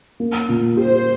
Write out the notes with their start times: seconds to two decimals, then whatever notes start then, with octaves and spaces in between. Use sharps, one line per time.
0.20 A#3
0.49 A#2
0.77 G4 C5